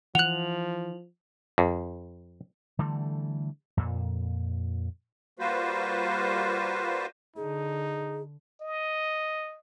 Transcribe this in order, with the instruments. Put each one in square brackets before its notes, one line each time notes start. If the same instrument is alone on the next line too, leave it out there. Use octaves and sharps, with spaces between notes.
[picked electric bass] E3 [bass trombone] F3 [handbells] F#5 F#6 [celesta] F7 F#7
[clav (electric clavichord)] F2
[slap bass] D3 E3 G3 A3
F2 A#2
[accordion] G3 A#3 F4 F#4 B4 C5
[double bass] D3 [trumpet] D#4 [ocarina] G#4
[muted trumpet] D#5